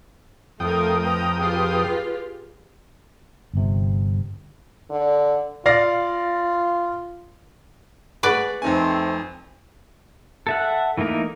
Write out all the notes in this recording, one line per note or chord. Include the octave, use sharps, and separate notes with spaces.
F2 A3 F4 A4 A#4 G5 D#6
B4 A#5
F4 G4 G#4
G1 C3
D3
F4 D5 F5 A#6
G#4 B4 D5 F#5 C#6
F2 A3 C4 D#4 G#5
A4 E5 F#5
E3 A3 A#3 D#4 A#4